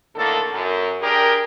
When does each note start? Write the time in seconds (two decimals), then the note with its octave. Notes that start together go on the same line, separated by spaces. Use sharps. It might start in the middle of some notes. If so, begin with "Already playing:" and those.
0.15 A2 D3 D#3 A#3 A4
0.51 F#2
1.01 D4 G4 G#4 A#4